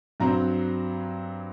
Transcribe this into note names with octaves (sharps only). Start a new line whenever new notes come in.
G2 F#3 C4 A#5